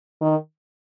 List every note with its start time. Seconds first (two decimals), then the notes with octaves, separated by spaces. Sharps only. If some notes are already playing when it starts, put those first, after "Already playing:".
0.21 D#3